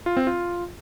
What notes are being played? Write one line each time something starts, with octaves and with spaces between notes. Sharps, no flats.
F4
C4
F4